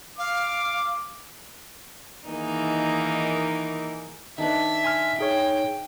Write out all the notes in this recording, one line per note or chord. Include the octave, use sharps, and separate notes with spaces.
F5 D6
D#3 E3 A#3 D#4 G#4
D#3 D4 B4 E5
G#5 C6 F6
D#4 G#4 C#5 G5